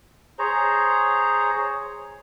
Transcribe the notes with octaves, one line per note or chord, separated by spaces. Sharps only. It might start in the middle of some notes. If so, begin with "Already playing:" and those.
G#4 C5 C#5 A#5